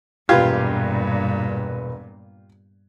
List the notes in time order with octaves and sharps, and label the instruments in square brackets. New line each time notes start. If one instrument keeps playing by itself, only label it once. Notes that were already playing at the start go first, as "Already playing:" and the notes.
[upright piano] E1 B4 G#6 [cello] G2 A#2 [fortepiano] F4 G4 F5